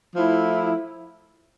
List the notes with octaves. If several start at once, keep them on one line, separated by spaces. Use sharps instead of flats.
F3 A3 E4